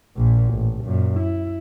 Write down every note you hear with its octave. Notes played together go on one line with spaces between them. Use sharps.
A#1 A#2
A1
F#2 A#2
E4